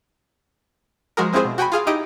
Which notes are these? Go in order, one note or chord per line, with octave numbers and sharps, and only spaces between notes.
F3 G#3 F#4 G#4 A#4
G#3 C4 E4 F4 G#4 C5
B2
F#4 G5 G#5 B5
F4 G#4 F5
D#4 E4 G4 D#5 D7